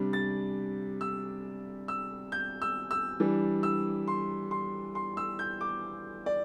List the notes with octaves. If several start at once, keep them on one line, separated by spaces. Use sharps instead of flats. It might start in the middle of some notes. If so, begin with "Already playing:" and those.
Already playing: C3 G3 D4
A6
E6
E6
G6
E6
E6
E3 G3 D4
E6
C6
C6
C6
E6
G6
D6
D5